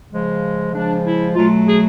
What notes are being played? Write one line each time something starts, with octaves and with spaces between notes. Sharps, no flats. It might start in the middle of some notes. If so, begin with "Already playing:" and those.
C#3 F3 G#3
C#3 F3 G#3 D4
E4
B2 F#3 A3 F4
G#4